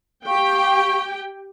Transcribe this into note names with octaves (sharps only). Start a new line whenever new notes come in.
G4 F5 G5 C#6